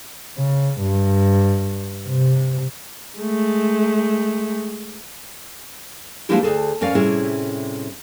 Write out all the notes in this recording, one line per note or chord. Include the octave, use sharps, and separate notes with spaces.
C#3
G2
C3
G#3 A3
F3 G#3 A#3 D4 E4 G4
D2 C3 G#4 A4
F2 C#4 A#4 D5 F5
A2 C3 G3 C#4 E4 G#4